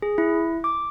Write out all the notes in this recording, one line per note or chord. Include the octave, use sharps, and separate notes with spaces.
G#4
E4
D6